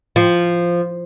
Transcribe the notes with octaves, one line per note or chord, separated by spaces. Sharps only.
F3